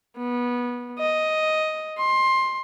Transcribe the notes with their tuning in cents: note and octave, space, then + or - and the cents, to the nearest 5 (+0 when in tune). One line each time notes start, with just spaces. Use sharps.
B3 -20
D#5 +5
C6 +15